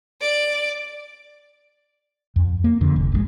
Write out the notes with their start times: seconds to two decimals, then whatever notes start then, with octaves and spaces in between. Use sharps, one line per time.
0.21 D5
2.36 F2
2.64 A#3
2.81 F2 D3
2.96 F1
3.12 A1 C3 G#3